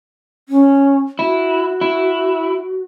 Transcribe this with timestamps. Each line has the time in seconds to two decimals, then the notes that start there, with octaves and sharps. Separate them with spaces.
0.49 C#4
1.19 E4 F#4
1.81 E4